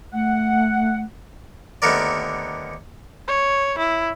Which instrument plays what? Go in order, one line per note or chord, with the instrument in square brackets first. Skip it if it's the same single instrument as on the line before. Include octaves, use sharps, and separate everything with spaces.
[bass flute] A3 [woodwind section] F#5
[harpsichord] D#2 D3 A3 B3 A#4 D5
[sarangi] C#5
E4